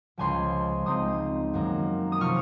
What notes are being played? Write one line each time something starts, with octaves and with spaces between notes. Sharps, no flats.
C#2 C#3 F3 G#5 C6
C#2 C#3 G#3 C4 D#4 C6 D#6
F#2 D#3 A#3
D#6
C3 F3 C#6 F6